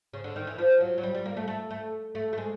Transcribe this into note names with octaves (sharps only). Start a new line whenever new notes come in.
C#3
D3
D#3
E3
F3
F#3
F#3
G3
G3
A#3
A3
A3
A3
A3
A3
G#3